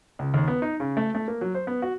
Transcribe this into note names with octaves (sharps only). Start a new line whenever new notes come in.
C#2
D#2
B3
D#4
C#3
A3
A3
A#3
F#3
C5
B3
F#4